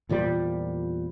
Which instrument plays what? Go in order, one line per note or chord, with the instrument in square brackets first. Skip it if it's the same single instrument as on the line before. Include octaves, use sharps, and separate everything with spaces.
[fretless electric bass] E2 A#2 F3 G3